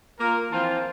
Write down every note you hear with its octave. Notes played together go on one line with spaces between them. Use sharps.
A#3 F4 A#4
E3 F3 C4 F4 A5